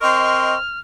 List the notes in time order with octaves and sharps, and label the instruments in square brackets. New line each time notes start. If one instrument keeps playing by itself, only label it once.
[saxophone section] C4 A#4 D#5 [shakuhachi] C6 [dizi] C#6 [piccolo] F6